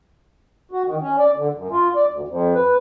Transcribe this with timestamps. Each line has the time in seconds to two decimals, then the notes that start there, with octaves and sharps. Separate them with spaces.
0.71 F#4
0.86 D#3
1.01 C#4
1.19 D5
1.37 D3
1.53 F#2
1.71 F4
1.95 D5
2.10 D2
2.28 F2
2.55 B4